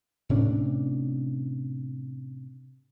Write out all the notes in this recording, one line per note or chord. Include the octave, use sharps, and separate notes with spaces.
A2 C3 C#4 D4